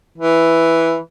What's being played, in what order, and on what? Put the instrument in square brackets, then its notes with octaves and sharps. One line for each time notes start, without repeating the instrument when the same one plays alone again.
[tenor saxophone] E3